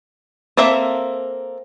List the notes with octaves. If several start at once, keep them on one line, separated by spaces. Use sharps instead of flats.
A#3 C4 A4 E5